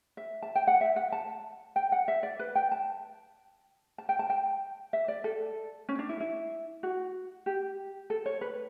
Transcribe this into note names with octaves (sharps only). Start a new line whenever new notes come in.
E5
A5
G5
F#5
E5
F#5
A5
G5
F#5
E5
D5
B4
G5
A5
A5
G5
A5
G5
E5
D5
A4
C#4
D4
E4
E4
F#4
G4
A4
C#5
B4